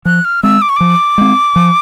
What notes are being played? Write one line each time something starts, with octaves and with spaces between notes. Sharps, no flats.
F3 F#6
F6
G#3 C4 E6
D6
C#6
F3 D6
G#3 C4
F3